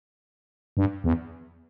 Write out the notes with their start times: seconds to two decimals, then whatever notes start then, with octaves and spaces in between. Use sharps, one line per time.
0.77 G2
1.04 E2